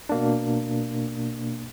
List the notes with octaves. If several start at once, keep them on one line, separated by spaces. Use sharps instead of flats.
B2 A#3 D4